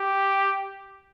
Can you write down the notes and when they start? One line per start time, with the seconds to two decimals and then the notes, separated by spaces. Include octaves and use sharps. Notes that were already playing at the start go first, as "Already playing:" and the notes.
Already playing: G4